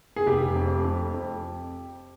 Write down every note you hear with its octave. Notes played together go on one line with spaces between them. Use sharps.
G#4
F1 G4
F2
F2
F2